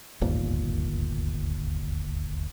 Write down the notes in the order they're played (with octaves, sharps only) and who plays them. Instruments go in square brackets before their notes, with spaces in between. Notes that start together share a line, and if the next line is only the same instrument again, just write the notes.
[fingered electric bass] D1 G1 D#2 A#2